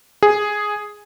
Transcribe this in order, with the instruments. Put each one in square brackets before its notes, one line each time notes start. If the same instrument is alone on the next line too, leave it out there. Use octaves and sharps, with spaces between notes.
[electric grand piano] G#4